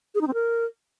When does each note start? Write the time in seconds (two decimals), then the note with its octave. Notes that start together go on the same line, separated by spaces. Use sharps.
0.15 G#4
0.21 D#4
0.27 C4
0.34 A#4